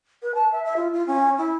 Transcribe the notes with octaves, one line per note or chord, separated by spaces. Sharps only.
B4
A5
E5
E5
F4
F4
C#4
E4